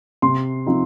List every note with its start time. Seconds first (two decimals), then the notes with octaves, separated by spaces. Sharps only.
0.22 C3 C6
0.66 F3 C4 D#4